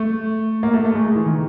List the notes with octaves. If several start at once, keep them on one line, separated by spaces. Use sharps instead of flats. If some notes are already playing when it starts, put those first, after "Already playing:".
Already playing: A3
A#3
A3
A3
G#3
E3
D#3